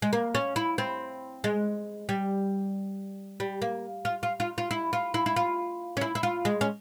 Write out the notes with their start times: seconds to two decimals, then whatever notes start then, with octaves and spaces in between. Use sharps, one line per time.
0.02 G#3
0.13 A#3
0.35 C#4
0.56 E4
0.78 C4
1.44 G#3
2.09 G3
3.40 G3
3.62 A#3
4.05 F4
4.23 F4
4.40 F4
4.58 F4
4.71 E4
4.93 F4
5.14 E4
5.26 E4
5.36 F4
5.97 C#4
6.01 E4
6.15 E4
6.23 F4
6.45 G#3
6.61 C#4